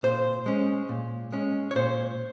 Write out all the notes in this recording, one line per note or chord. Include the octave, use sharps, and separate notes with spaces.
A#2 C5
G#3 C#4
A#2
G#3 C#4
C#5
A#2 C5